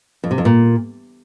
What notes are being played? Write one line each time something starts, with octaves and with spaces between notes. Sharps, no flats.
F2
C3
F2
A#2